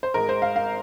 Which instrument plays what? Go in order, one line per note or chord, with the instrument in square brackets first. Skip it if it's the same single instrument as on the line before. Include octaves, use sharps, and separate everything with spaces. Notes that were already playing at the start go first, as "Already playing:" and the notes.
[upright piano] C5
G#1 G#2 G#3 A#4
C5
F5
F5